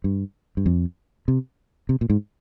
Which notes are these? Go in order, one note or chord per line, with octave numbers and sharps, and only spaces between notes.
G2
G2
F2
C3
C3
A#2
G#2